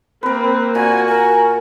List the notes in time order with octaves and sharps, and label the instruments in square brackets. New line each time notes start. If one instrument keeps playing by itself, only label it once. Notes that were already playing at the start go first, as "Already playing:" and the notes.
[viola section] A#3 C4 [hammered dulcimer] A#4 B4
[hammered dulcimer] A#2 [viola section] F#4 [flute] G#5
[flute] A#4 [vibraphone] G#5